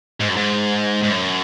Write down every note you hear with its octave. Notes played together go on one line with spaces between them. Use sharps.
G#2
F#2
G#2
G#2
F#2